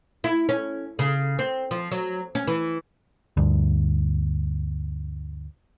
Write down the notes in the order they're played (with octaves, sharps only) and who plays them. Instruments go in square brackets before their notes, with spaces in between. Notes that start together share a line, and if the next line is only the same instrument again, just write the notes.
[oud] E4
C#4
C#3
C4
F3
F#3
C#4
E3
[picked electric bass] D2 G2